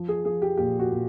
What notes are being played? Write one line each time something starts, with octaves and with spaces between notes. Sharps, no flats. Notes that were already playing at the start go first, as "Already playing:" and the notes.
Already playing: F3
G#4
F3 G#4
G4
A#2 G4
F#4
A#2